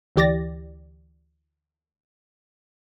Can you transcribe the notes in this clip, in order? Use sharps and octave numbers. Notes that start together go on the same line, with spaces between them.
D2 E3 G4 D5 A6 A#6